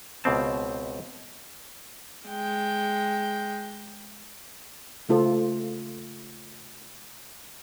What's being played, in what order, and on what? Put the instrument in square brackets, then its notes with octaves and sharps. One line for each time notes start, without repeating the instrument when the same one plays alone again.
[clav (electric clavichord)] C#2 B2 C4 A5
[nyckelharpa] G#3 G5
[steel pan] C#3 A3 F4 A4 C5